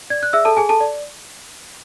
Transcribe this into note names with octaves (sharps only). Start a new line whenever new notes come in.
D5 G#6
F#6
G#4 E5 E6
A4 A5
G#4 G#5
A4 A5
D5